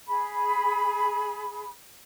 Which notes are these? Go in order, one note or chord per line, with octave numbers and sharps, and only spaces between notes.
G#4 B5